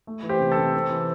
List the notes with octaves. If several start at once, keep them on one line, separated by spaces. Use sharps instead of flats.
A3
E3
G4 C5
C3
A4
C3
C4
E3